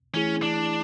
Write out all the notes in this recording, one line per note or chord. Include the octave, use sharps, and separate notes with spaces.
E3 A3 C#4 E4 G#4
D4